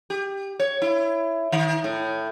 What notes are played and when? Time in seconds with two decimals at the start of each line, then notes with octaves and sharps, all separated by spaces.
0.10 G4
0.60 C#5
0.82 E4
1.52 D#3
1.84 A2